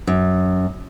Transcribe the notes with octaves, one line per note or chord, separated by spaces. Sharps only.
F#2